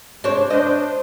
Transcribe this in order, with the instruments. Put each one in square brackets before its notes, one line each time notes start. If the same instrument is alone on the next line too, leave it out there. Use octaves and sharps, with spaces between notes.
[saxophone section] C3 G#3 [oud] D4 C5 C#5
[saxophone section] D4 C5 [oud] D#5